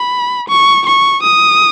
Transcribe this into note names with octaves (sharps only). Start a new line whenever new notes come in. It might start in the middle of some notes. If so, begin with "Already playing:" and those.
Already playing: B5
C#6
C#6
D#6